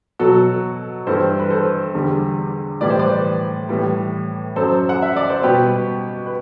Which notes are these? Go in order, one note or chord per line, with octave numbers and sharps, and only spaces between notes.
B2 F#3 F#4 A4
G2 E3 G3 A4 C5
B4
A4 C5
E2 D3 G3
A2 E3 G3 D5
C5
B4 D5
A2 E3 G3
F#2 F#3 A4 C5
F#5
E5
D5
C5
B2 G3 G4 B4
B4